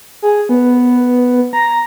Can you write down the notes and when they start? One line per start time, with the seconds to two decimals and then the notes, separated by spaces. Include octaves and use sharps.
0.22 G#4
0.49 B3
1.53 A#5